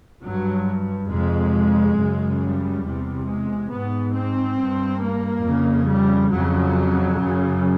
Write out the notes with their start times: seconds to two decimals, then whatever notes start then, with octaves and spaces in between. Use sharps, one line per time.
0.22 G2 F#3
1.09 F2 C3 G#3
1.97 F#2 C#3
2.40 G3
2.83 E2 C3
3.26 G#3
3.70 G#2 B3
4.14 C4
4.58 G2
5.01 A#3
5.45 F2 C#3
5.88 G3
6.31 F2 C#3 F#3
7.18 F#2 C#3